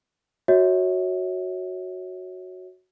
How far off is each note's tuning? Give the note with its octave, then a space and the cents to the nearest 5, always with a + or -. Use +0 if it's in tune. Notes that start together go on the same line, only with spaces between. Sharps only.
F#4 +0 C#5 +0 E5 -35